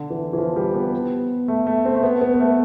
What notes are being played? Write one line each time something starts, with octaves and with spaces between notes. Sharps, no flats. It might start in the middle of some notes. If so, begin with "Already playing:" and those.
Already playing: D3
E3
E3
F3
G3
B3
A3
A3
C4
A3
B3
B3
B3
A3